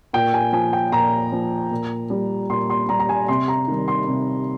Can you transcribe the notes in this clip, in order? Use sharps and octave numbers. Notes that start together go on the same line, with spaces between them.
A#2 G5
G#5
F3 G#5
G5
A#2 A#5
F3
A#2
G3
A#2 C6
C6
G3 A#5
A#5
G#5
C3 C6
A#5
D#3 G3
C6
C3